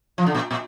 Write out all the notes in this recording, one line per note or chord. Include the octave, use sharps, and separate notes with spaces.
F3
D3
A#2
A#2